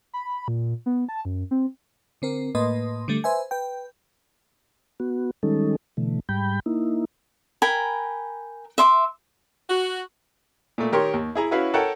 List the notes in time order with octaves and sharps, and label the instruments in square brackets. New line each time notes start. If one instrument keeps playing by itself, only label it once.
[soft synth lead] B5
A#2
B3
A5
F#2
C4
[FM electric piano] D3 C4 A#4
A2 A#3 B4 D#5 C6 D#6
D3 G3 A3
B4 C5 E5 G#5
B4 G5
[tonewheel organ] B3 F#4
D#3 G3 G#3 C#4 D#4 A4
B2 D3 E3 A3
G#2 G3 G5 B5 G6
A#3 D#4 E4
[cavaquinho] A#4 G5 G#5 B5
E5 C6 D6
[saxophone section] F#4
[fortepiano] A#2 A3
D#3 G4 A#4 C#5 C6
D#2
E4 G#4 A#5
C#4 E4 F#4 B4 F5
A4 A#4 C#5 F#5 G5 A5